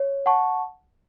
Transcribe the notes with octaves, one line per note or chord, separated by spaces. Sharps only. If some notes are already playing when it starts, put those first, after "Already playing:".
Already playing: C#5
F#5 A5 C#6